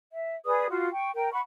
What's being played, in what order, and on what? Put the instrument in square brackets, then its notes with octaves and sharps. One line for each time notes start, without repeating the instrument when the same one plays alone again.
[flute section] E5
G#4 B4 D5 D#6
F4 F#4
G5 C#6
A#4 G5
F#5 B5 C#6